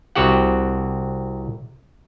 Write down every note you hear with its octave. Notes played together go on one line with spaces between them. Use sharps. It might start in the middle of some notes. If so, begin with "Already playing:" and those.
C2 C4 F#4 G4 F#5